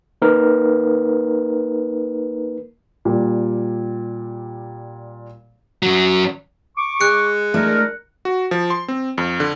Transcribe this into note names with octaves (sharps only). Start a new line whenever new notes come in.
A#3 D#4 A#4 B4
A#2 G3
F#2 F#3
C#6 D6
G#3 F#6 C#7
A3 D4 E4 A#4
F#4
F3
C6
C4
F2
D3